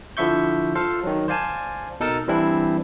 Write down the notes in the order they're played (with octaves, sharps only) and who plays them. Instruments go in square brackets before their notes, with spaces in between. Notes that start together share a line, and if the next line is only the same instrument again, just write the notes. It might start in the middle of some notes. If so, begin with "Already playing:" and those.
[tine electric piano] D3 F3 E4 E5 C#6 G6
F4 A4 C5 F5
D#3 F#3
C5 D5 F5 G#5 A5
B2 D#4 A4 A#4 A5
E3 G3 C4 D4 E4